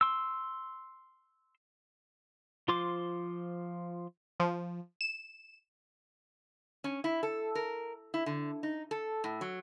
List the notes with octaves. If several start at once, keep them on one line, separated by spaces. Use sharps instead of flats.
C6 E6
F3 F4 C5 C6 D6
F3
E7
C#4
E4
A4
A#4
E4
D3
D#4
A4
A2
F#3